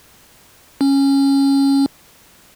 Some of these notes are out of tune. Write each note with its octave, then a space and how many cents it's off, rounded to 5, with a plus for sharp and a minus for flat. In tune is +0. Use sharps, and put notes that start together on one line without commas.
C#4 -10